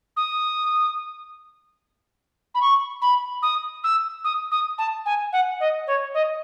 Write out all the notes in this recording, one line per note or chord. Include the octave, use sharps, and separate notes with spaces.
D#6
B5
C#6
B5
D#6
E6
D#6
D#6
A5
G#5
F#5
D#5
C#5
D#5